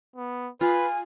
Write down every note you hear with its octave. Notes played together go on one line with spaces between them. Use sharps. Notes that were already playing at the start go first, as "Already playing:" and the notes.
B3
F4 B4 G#5